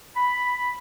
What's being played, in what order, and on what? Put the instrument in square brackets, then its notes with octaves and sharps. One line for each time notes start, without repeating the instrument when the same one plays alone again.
[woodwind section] B5